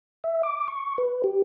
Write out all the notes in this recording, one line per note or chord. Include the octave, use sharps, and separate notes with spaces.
E5
D6
C#6
B4
G4